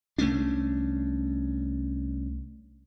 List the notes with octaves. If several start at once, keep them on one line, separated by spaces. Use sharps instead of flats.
C2 A3 C#4 D4